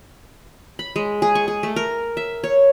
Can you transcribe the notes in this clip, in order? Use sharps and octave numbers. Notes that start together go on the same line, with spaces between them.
B5
G#3
G#4
C#6
G#4
A3
A#4
E5
C#5